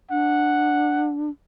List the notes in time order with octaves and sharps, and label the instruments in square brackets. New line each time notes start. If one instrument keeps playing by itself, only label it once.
[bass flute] D4 [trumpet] F#5